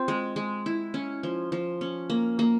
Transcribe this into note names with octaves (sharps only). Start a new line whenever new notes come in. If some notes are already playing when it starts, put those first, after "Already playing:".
Already playing: C4 F4
G#3
G#3
E4
C#4
F3
F3
C#4
A#3
A#3